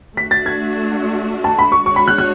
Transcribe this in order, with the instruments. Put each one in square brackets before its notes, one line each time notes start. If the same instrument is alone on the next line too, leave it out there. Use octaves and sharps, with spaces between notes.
[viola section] A3 D4 F#4 [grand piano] B6
[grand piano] A6
G#6
A5
B5
C#6
[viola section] G#3 D4 F#4 C#5 [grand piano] C#6
[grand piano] B5
F#6
F#6